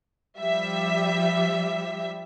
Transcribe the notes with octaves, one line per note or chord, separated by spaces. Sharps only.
F3 G3 E5